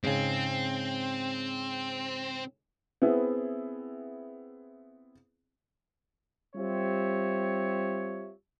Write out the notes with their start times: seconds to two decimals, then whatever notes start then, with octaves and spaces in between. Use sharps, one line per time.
0.04 G#2 C#3 C4
3.02 B3 C4 E4 G#4
6.56 G3 C4 F4 G4 C#5 E5